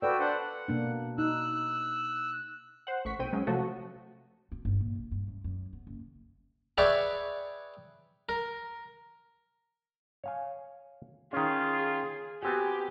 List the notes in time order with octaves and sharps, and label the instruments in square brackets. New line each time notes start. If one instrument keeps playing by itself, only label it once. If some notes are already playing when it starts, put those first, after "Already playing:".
[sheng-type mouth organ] F#4 G5 E6 [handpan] A4 B4 D5
[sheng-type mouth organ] D4 C5 F#5
F#5
[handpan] B2 A#3 D4
[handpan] D#4 [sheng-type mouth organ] E6 F#6
[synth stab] C5 F#5
A1 C#6 B6
B1 C4 G5 D#7
F#3 G#3 C#4
C3 F3 F#3 A3 F#4 A4
[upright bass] C4
G1
A#2
A#1
G2
F#2
F#2
B3
F#1
[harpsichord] G#4 B4 C#5 D5 E5 G5
A#4
[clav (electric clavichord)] C#5 F5 G#5
[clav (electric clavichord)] D#3 C#4 [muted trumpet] F4 [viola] G#4
[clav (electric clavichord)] B3 C4 F#4 [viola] G4 [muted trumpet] G#5